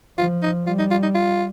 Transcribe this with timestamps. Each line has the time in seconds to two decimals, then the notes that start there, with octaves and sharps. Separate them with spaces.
0.18 F3 F4
0.43 D#4
0.66 G3 F4
0.79 D#4
0.91 F4
1.03 D#4
1.15 F4